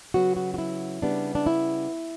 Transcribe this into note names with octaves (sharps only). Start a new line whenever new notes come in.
C#3 F#3 B3 F#4
F#4
F#4
E4
C#3 G3 B3 D4
D4
E4